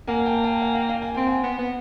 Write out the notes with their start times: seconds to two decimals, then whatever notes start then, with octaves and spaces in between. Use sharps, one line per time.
0.07 A#3 F#5 G#5
0.20 G#5
0.26 G5 A5
0.44 G5 A5
0.62 F#5 G#5
0.75 F5 G5
0.89 F5 G5
1.02 G#5
1.15 C4 G5
1.27 F#5 G#5
1.43 B3
1.59 B3